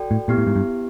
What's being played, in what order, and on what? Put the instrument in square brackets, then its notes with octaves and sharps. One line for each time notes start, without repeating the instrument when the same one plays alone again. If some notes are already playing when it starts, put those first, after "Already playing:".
Already playing: [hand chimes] F#4 A4 D5 G5
[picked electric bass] A2
[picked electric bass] A#2 [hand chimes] B3 E4 G4
[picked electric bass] A2
G#2
G2